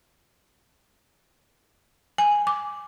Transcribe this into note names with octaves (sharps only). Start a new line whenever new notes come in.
G#5
D6